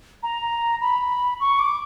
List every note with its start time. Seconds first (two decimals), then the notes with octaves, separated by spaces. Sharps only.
0.23 A#5
0.81 B5
1.40 C#6
1.59 D6